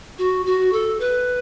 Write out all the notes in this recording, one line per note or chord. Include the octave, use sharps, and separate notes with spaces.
F#4
F#4
A4
B4